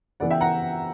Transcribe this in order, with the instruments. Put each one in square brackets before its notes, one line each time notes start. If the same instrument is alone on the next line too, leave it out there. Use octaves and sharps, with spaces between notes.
[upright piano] C#3 E3 B3 D5 F#5
E5 G5
F#5 A#5